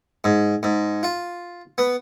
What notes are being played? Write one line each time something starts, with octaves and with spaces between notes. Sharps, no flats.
G#2
G#2
F4
B3